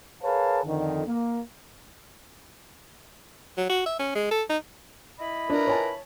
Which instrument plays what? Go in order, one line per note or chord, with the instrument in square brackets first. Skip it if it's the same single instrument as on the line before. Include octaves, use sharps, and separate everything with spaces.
[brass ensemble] G#4 A#4 B4 C#5 F5 A5
F2 D3 D#3
A#3
[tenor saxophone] F#3
F#4
E5
C#4
G#3
A4
D#4
[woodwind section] E4 D#5 B5
[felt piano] D4 [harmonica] A#4 B4
[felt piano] C#5 G#5 A5